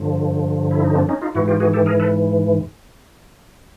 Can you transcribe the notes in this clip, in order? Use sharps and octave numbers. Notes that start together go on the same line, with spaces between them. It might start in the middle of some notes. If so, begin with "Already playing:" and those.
Already playing: G2 D3 F3
E4
D#4
C4 D4
C#4 D#4
D#4 F4
G#2 E3 E4 F#4
F4 G4
F#4 G#4
G4 A4
G#4 A#4
A4 B4